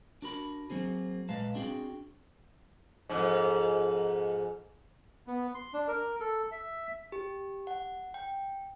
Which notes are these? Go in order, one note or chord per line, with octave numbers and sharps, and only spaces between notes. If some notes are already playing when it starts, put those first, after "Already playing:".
D4 F#4 A#4 B5
F#3 A#3 C4 G#4
A#2 G#3 B4 F5 A5
C4 D4 F#4 G#4 G5
F2 G#2
B3
C6
D4
A#4
A4
E5
G4
F#5
G5